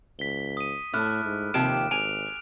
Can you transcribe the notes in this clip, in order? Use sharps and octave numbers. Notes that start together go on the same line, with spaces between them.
C#2 B6 G7
D#6 D#7
A2 A3 E4 D6 F6 F#6
G#2
D#2 C3 F3 G4 F6 D7 E7
G#1 G#5 D7 F7